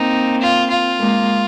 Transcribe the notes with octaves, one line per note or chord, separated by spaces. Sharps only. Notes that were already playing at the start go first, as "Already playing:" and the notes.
Already playing: A#3 C4 D#4
F4
F4
G#3 A#3